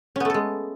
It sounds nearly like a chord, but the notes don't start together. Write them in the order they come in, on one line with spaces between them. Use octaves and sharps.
C#4 B3 A3 A4 G#3